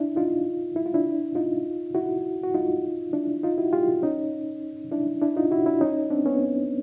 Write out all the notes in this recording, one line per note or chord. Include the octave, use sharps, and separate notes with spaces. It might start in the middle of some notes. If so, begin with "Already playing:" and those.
Already playing: D4 E4
D#4 F4
E4
F4
D4 E4
D#4 F4
E4 F#4
F#4
D#4 F4
D4 E4
D#4 F4
E4 F#4
F4 G4
C#4 D#4
D4 E4
D4 E4
D#4 F4
E4 F#4
D4 E4
C#4 D#4
C4 D4
B3 C#4